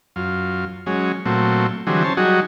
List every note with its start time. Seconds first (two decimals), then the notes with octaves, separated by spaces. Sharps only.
0.16 F#2 F4
0.86 F#3 G#3 C#4
1.26 A#2 F#3 A3 C4
1.87 D3 E3 F#3 G3 C4 G#4
2.04 C#4 C5 A5
2.17 F#3 G3 D#4 F#4 G#4